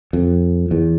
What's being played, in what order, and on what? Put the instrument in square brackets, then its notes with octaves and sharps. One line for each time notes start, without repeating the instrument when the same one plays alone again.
[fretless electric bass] F2
E2